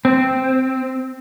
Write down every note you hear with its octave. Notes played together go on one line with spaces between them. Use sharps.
C4